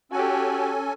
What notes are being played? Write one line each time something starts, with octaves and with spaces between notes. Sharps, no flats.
C#4 F#4 G4 A4 G#5